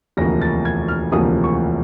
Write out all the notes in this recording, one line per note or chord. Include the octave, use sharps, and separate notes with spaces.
E1 D2 C3 F3 A#3 A#6
A6
G#6
F6
E1 D2 C3 F3 A#3 D#6
C#6